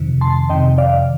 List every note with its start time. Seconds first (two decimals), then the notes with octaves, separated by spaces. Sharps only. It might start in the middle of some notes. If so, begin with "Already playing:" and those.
Already playing: F2 C3 D#3
0.21 A5 C6
0.49 F2 C3 D#3 D#5 G5
0.78 D5 F5